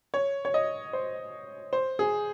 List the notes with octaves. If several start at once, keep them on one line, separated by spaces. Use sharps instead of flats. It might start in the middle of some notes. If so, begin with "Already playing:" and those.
C#5
C#5
D#5
C5
C5
G#4